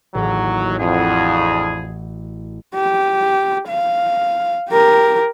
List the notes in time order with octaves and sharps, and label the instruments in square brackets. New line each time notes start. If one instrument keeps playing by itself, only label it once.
[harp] A1 [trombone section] D#2 F#3
[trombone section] F2 [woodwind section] D4 E4 G#4 [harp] F#4
[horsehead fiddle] G4
F5
G4 A#4